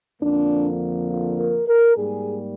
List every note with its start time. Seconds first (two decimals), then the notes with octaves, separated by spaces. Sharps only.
0.22 F2 D3 F3 A#3 D4
1.09 F4
1.39 A#4
1.68 A#4
1.97 G#2 G3 A#3 G#4